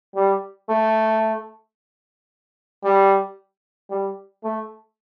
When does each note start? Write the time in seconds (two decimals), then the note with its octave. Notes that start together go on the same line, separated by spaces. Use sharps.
0.15 G3
0.69 A3
2.83 G3
3.90 G3
4.43 A3